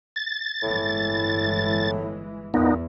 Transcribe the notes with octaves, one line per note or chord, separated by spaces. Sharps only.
A6
G1 A2 E3 G#3
E2 A#2 B3 D#4